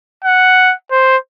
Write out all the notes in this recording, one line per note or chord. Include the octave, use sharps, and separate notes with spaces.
F#5
C5